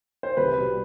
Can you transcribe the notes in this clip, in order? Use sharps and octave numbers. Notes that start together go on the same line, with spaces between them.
C5
C2 B4
B2 G3